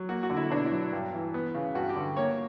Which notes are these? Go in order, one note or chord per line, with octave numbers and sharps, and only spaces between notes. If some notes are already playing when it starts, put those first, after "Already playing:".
Already playing: F#3
A#3 F#4
F#4
D3
E4
B2 D4
E4
F#3
G2
E3
B3
C#3
G2 F#4
G4
D3
A#3 C#5